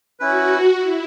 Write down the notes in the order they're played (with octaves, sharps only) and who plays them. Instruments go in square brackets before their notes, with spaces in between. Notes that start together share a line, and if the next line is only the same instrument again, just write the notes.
[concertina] C#4 E4 B4 [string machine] F#4
[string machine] E4